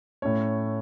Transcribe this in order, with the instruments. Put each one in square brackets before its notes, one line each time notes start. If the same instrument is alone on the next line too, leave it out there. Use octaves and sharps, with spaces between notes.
[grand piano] A2 A3 C#4 C#5